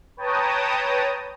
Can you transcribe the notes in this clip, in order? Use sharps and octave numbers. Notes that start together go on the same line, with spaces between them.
B4 C#5 G5 A5 A#5 D#6